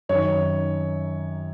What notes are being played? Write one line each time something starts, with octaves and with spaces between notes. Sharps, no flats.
F#2 D#3 C#5